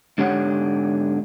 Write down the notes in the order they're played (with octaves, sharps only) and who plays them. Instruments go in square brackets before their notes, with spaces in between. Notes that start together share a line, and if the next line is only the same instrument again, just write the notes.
[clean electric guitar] G#2 D3 G4 C#5 F#5